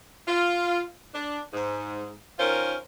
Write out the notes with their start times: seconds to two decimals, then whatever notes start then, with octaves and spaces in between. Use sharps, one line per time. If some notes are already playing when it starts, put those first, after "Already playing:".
0.28 F4
1.14 D4
1.53 G#2
2.39 D#3 C#4 F4 A#4 C5